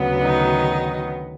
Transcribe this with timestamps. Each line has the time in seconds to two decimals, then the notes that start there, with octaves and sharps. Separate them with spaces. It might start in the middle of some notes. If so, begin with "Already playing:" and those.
Already playing: D2 C#3 F#3 B3
0.22 D#3 D#4